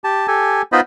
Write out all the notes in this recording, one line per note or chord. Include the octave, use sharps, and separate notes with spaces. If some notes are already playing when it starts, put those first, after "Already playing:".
G4 A5
G4 A4 G#5
B3 D#4 F4 C5 D#5 B5